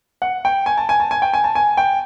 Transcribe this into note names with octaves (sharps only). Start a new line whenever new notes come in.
F#5
G5
G#5
A5
G#5
A5
G#5
G5
G#5
A5
G#5
G5